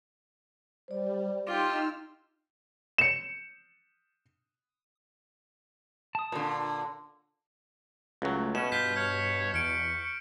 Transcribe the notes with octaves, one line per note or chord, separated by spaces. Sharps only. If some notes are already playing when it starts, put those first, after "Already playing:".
G3 C5 D5
D#4 F4 G4 G5 C6 D6 E6 F6
C#7 E7
A5 D#6
A#2 D3
C#2 F#3 A3
B2 C#4 E7
G2 F4 G6 B6 C7
C#5 F6 C#7
E2 C#6 F6 D7